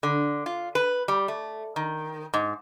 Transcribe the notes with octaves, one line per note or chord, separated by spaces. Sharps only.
D3
F4
B4
G3
A3
D#3
G#2